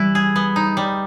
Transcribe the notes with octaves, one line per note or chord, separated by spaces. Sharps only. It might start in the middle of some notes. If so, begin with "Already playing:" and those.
Already playing: E3 G3 E4 B4
G#4
B3
D#4
G3